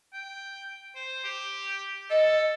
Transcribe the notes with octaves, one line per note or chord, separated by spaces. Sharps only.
G5
C5
G4
A4 D#5